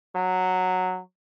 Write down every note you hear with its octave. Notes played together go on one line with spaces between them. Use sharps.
F#3